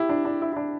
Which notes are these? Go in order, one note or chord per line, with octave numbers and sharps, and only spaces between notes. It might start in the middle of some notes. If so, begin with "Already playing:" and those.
Already playing: E4 G4
D4
D4
E4
E4
D4